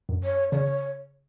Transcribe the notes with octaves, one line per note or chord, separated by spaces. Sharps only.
F#2
C#5
C#3 C#5 D5